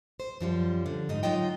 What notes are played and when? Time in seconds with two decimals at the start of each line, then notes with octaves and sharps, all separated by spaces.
0.20 C5
0.41 F#2 F3 G3
0.86 D3
1.09 G#2 D#4
1.23 F#3 D#4 F4 D#5 G5